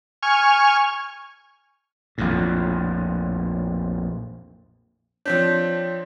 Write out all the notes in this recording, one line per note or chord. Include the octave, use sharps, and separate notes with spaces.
G#5 C#6 F6
A#1 F2 A2
F3 C4 D4 C#5 G6 B6